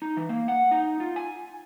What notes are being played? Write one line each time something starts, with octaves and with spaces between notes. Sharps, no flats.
D#4
E3
A#3
F#5
D#4
F4
G#5